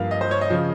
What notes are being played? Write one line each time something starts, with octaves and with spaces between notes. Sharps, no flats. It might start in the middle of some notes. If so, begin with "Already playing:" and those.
Already playing: G2 F3 A#3 F5
D#5
C5
C#5
D#5
C#3 F3